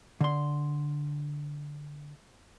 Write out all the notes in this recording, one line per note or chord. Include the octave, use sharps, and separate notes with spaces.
D3 C6